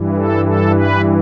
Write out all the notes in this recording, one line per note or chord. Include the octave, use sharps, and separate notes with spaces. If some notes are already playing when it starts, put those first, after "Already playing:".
Already playing: G2 E3
A4
A4
B4